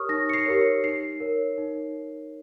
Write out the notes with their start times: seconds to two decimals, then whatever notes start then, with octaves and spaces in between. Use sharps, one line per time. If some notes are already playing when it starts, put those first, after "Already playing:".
Already playing: G4 A#4 C#5 C#6 D#6 F6
0.09 D#4 A#6
0.29 C#7
0.33 C7
0.46 G4 A#4 C#5
0.84 D#4 C7
1.20 A#4 C#5
1.58 D#4